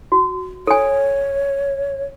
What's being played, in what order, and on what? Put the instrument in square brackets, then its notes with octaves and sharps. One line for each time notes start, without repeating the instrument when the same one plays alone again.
[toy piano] F#4
[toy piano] A4 G#5 [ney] C#5